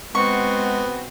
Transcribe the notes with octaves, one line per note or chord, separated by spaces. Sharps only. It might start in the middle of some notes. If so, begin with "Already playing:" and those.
G#3 B3 C4 F#4 C#6